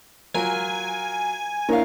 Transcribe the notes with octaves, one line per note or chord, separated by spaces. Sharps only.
F#3 F4 A#4 G#5
A#3 D4 E4 A#4 C#5 F5